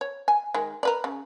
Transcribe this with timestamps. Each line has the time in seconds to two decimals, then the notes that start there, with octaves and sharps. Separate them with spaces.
0.01 C#5
0.28 G#5
0.54 D#3 G#3
0.83 A#4 B4 D5
1.04 C#3